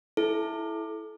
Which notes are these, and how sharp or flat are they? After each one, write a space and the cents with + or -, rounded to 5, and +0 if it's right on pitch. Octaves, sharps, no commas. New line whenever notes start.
E4 +0 A4 -25